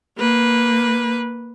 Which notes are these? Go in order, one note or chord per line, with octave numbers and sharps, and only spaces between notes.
A#3 B4